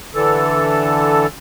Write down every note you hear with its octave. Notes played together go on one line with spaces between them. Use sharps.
D3 E3 A4